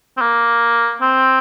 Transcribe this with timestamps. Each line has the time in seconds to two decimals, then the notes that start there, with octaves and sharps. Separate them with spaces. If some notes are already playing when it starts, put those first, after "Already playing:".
0.17 C4
0.21 A#3
1.01 C4